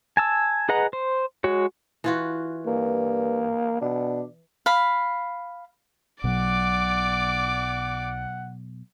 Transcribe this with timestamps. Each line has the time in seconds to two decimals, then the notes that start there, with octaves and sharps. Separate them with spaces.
0.17 G#5 A5 E6
0.69 G#4 B4 D#5 F#5 A#5
0.93 C5
1.44 G#3 F#4 C#5
2.04 E3 F4 F#4
2.66 G2 A#3
3.81 B2 D4
4.66 F5 B5
6.24 B1 B2 F#3 D5 F#5 D6